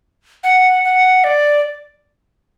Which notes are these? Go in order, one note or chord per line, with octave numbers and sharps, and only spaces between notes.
F#5
F#5
D5